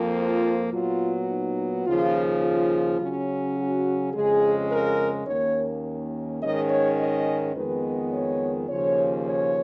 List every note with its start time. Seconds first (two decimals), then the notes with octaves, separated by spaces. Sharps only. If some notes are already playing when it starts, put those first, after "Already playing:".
Already playing: F2 F3 A#3
0.16 F4
0.73 A#2 F#3 B3 F4
1.29 D#4
1.86 D#2 C#3 F3 F4
2.43 F4
3.00 C#3 F#3 C#4
3.57 F#4
4.14 F2 C#3 G#3 G#4
4.71 A#4
5.27 D#2 D#3 A#3 C#4 C#5
6.42 G#2 D#3 G#3 C#4 D#5
6.70 C#5
6.99 D#5
7.55 F2 D#3 G#3 B3 B4
8.13 C#5
8.69 D#2 C#3 F3 C#5
9.26 C#5